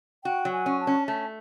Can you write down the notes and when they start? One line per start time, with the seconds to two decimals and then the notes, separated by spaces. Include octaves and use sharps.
0.25 F#4 G5
0.45 F#3
0.52 G#5
0.66 C#4
0.80 A5
0.87 C#4
1.08 A3 A5